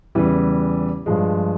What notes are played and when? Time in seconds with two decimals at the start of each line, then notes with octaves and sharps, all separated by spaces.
0.15 E2 C#3 E3 G3
1.06 G2 F3 G#3